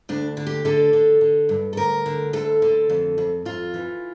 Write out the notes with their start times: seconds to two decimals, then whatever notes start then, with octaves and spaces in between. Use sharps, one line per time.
0.09 D2 D4
0.37 D3
0.47 G4
0.65 D3 A4
0.93 D3
1.21 D3
1.49 G2
1.73 A4
1.77 D2 A#4
2.06 D3
2.33 D2 A4
2.62 D3
2.90 F2
3.18 F2
3.45 F2 F4
3.74 E3